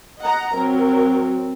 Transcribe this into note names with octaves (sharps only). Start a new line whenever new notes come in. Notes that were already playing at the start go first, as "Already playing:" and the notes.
D#5 F#5 A#5
F#3 C4 A#4